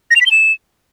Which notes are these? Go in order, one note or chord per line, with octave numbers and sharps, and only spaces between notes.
A#6
F7
B6
G7
E7